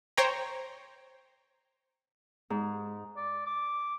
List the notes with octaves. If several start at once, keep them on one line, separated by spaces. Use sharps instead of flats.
C5 C#5 G5 A#5
G#2
D5
D6